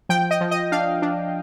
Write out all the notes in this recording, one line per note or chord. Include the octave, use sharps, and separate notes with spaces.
F3 G5
D#5
F3
D#5
D4 F5
D4